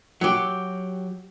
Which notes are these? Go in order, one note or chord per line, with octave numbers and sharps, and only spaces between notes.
F#3 G4